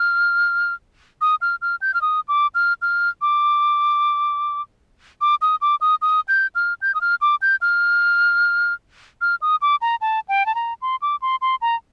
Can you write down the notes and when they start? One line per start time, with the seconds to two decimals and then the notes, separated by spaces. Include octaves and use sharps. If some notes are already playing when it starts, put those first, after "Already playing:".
Already playing: F6
1.21 D#6
1.42 F6
1.62 F6
1.82 G6
1.94 F6
2.02 D#6
2.28 D6
2.55 F6
2.82 F6
3.22 D6
5.21 D6
5.42 D#6
5.62 D6
5.81 D#6
6.02 D#6
6.28 G6
6.55 F6
6.82 G6
6.95 D#6
7.01 F6
7.21 D6
7.42 G6
7.61 F6
9.21 F6
9.42 D#6
9.62 D6
9.82 A#5
10.01 A5
10.28 G5
10.46 A5
10.55 A#5
10.82 C6
11.02 D6
11.22 C6
11.41 C6
11.62 A#5